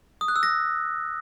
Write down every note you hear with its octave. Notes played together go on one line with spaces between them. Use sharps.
D#6
F#6
E6
A#6